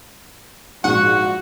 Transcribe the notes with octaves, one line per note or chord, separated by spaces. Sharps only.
A#1 G#2 F#4 F#5